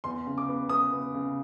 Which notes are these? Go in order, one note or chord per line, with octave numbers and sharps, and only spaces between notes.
E2 C6
C#3
D6
B3
B3 D#6
B3
C#3